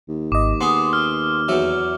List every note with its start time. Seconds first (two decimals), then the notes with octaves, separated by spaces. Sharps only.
0.09 D#2
0.32 G#1 D#5 D6
0.61 B3 G#4 C6
0.93 F6
1.48 E2 F#3 E5